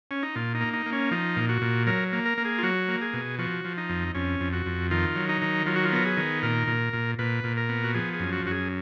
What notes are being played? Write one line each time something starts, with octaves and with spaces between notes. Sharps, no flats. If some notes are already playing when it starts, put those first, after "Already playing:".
C#4
D#4
A#2 F4
D#4
A#3
D#4
A#3
C#4
F3 D#4
A#2
F#4
A#2
F#3 A#4
A#3
A#4
A#3
G#4
F4
F#3 F#4
A#3
G#4
B2
F3 F#4
F3
D#4
F2
F2 C#4
F2
F#4
F2
D#3 F4
F#3
D#4
D#3
F#3 F4
F#4
F4
B3 A#4
G#4
D#3
A#2 A#4
A#2
A#2
A#2 B4
A#2
A#4
B3
F#4
F3 G#4
G#4
F#2
F#4
F#2 F#4
G#4